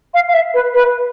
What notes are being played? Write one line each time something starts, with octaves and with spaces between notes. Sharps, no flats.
F5
F5
E5
B4
B4